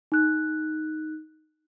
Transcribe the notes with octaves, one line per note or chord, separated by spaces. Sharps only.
D#4 F#6